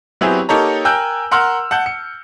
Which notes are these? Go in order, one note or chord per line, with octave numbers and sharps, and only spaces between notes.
F#3 B3 C4 E4 G4 G#4
A#3 D#4 G4 A4 C#5 A#5
A#4 G5 G#5 E6 F#6 G6
A#4 F#5 C6 E6 F6
F#5 A5 G6 C#7
C#7